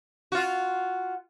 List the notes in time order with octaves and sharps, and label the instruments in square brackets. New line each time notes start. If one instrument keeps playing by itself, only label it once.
[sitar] F4 F#4